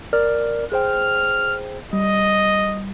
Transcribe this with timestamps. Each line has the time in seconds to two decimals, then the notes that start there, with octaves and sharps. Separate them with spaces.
0.13 A#4 D5 F6
0.72 G#4 C5 G5 F6
1.93 G3 D#5